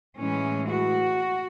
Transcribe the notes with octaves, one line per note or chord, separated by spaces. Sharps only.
A2 E3 G#3 C#4
F#4